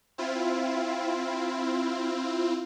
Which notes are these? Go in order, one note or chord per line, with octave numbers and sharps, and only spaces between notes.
C4 E4 F4